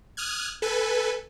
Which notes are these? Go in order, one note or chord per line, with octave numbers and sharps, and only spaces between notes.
D#6 F6 F#6 G#6
A4 B4 G#5